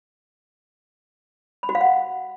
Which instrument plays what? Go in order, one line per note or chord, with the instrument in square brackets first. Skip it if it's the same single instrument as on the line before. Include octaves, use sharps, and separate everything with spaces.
[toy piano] B5
F#4
F5
F#5